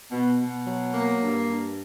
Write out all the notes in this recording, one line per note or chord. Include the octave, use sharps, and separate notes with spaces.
B2
B2
F#3
A#3
G2
G2